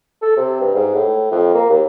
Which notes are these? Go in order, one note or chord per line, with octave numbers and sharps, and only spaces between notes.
A4
C3
G2
G#2
A2
F2
A#3
D#2